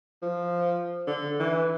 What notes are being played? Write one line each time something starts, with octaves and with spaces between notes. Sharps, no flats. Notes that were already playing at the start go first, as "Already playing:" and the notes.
F3
D3
E3